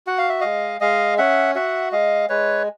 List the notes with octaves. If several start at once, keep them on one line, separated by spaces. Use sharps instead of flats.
F#4 F#5
F5
E5
G#3 D#5 F5
G#3 D#5 F5
C#4 E5 F#5
F#4 E5 F#5
G#3 D#5 F5
G#3 B4 C#5